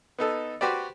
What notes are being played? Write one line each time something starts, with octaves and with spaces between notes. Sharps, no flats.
B3 D#4 A4
F#4 G4 B4 C5 D5